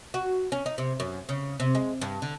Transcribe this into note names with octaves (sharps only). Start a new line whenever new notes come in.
F#4
C#4
D#4
C3
F#2
C#3
C3
G#3
G2
D3